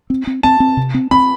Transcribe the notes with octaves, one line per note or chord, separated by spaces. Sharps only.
C4
C4
C4 A5
C4
C3
C4
C4 B5